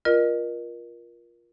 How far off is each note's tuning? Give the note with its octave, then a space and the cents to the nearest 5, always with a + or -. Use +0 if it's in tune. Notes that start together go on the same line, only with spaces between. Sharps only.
F4 +0 A#4 +25 D#5 -30